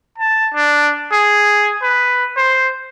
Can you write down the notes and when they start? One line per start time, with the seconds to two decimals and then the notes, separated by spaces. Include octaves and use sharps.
0.18 A5
0.54 D4
1.12 G#4
1.82 B4
2.37 C5